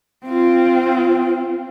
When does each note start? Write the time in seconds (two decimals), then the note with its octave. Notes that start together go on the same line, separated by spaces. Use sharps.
0.26 C4 F4